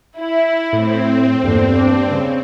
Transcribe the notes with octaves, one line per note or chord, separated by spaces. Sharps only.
E4
A2 C4
E2 G2 A#2 D3
D4
C#3